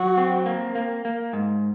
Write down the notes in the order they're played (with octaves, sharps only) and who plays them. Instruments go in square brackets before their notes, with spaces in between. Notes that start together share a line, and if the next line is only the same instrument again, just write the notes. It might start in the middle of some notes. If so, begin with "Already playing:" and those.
Already playing: [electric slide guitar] F#3 [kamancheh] F#4
[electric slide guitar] C4
A#3
A#3
A#3
G#2